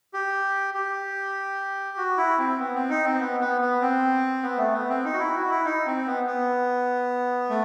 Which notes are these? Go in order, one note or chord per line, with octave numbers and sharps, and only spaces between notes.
G4
G4
F#4
E4
C4
B3
C4
D#4
C4
B3
B3
B3
C4
B3
A3
B3
C4
D#4
F#4
E4
F#4
E4
D#4
C4
B3
B3
A3